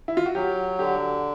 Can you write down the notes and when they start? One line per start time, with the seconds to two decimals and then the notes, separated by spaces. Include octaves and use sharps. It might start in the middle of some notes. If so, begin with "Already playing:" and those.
0.08 E4
0.17 F4
0.26 F#4
0.35 F#3 G4
0.79 D3 G4